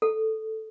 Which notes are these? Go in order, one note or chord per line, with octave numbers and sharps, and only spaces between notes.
A4